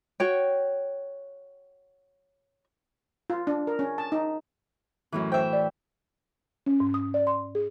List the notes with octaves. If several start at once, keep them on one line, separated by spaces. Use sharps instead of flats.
F#4 C#5 G5
F4
D4
A#4
C#4
A5
D#4
F#2 A2 E3
C5 E5 G5
D5
C#4
G#2
D#6
D5
C6
G#4